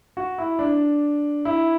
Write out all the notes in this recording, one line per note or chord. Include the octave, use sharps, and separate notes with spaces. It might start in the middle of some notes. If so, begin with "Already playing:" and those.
F#4
E4
D4
E4